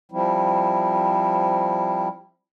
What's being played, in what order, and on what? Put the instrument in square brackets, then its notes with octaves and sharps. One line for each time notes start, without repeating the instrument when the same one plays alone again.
[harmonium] F3 G3 C4 E4